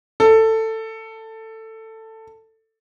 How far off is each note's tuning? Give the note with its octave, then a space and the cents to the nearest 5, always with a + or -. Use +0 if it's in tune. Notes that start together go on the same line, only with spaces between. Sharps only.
A4 +15